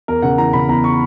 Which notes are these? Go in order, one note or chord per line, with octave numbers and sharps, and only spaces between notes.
E2 A#4
C#3 F#5
E3 A#5
C#3 B5
E2 A#5
C#6